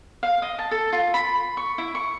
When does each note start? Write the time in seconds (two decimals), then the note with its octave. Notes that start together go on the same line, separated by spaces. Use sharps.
0.23 F5
0.42 D#5
0.59 A5
0.71 A4
0.93 F4
1.14 B5
1.57 C#6
1.78 E4
1.95 C#6